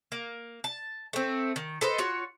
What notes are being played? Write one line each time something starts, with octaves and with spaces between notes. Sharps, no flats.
A#3
A5
A3 C4
D#3
A4 B4 C5 D#5
F4 F#4 C#5